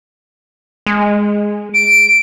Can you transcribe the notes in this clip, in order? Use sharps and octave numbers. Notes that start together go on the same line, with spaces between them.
G#3
D7